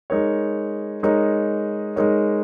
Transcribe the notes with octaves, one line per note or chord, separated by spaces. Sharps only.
G#3 D#4 A#4 C#5
G#3 D#4 A#4 C#5
G#3 D#4 A#4 C#5